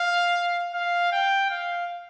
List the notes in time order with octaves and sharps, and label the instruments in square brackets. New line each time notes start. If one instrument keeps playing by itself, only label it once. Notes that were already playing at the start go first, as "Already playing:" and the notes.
Already playing: [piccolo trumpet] F5
F5
G5
F5